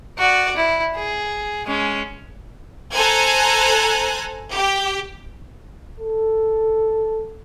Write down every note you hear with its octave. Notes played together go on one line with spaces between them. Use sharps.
F#4 D5
E4
G#4
G#3 C#4
A4 C5 G#5 A#5 F#6 G#6
G4
A4